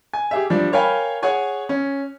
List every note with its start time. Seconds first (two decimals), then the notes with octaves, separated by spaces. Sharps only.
0.13 G#5
0.31 G4 G#4 E5
0.50 F3 G3 D4
0.72 A#4 C#5 F5 G5 G#5 B5
1.22 G#4 C#5 F#5 G#5 C#6
1.69 C#4